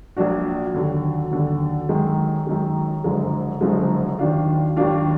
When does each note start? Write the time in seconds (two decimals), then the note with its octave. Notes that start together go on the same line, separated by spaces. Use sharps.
0.17 A#1 A#2 F#3 D4 F#4
0.74 D#2 D3 F#3
1.31 D#2 D3 F#3
1.89 F#2 D#3 G#3
2.46 F#2 D#3 G#3
3.04 F#1 F#2 D3 F3 G#3
3.61 F#1 F#2 D3 F3 G#3
4.19 D#2 D#3 F#3 D4 F4
4.76 D#2 D#3 F#3 D4 F4